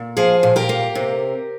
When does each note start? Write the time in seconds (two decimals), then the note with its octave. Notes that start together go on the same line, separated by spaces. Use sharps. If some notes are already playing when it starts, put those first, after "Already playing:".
Already playing: A#2
0.17 F3 G#4 C5
0.43 A#2
0.56 G4 A#4
0.69 A#3
0.95 C3